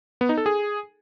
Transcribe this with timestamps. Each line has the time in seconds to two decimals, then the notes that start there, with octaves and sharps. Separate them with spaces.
0.21 B3
0.29 D#4
0.37 A4
0.46 G#4